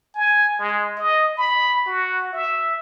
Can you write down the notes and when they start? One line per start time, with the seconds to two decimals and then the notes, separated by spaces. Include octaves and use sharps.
0.15 G#5
0.59 G#3
0.98 D#5
1.37 B5
1.86 F#4
2.33 E5